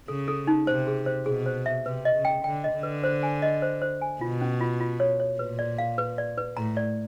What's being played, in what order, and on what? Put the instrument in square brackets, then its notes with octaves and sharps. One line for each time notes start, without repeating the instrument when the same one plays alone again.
[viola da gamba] C#3 [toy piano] A4
[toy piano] A4
D#4
[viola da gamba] C3 [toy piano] C5
[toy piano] G#4
C5
[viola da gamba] B2 [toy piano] G#4
[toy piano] C5
E5
[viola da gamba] C3 [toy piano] B4
[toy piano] D#5
[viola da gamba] C#3
[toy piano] G5
[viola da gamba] D3 [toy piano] G5
[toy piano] D#5
[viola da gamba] D3
[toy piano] B4
C5
G#5
D#5
C5
C5
G#5
[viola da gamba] B2 [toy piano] F4
[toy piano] C#4
F4
F4
C#5
C#5
[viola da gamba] A#2 [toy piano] B4
[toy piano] D5
F5
B4
D5
B4
[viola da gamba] A2 [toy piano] A#5
[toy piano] D5